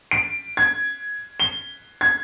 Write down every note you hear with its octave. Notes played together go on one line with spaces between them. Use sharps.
D7
G#6
G7
G#6